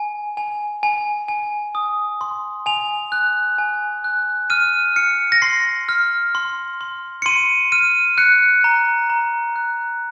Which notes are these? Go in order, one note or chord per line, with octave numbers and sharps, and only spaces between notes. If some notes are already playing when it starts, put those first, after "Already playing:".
Already playing: G#5
G#5
G#5
G#5
D#6
C6
G#5 F7
F#6
G#5
F#6
F6 D#7
F6 C#7
A#6
C6 C7
F6
C6
C6
C#7
C6 D#7
F6 D#7
F#6 C#7
A#5
A#5
F#6